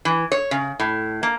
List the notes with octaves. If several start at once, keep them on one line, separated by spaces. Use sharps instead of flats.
E3
C#5
C#3
A2
A#3